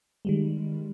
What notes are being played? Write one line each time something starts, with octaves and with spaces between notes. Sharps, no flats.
D#3 G3 G#3